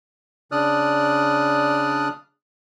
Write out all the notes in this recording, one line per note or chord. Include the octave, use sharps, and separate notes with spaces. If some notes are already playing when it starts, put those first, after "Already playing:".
C#3 D4 D5 D#6 F6 F#6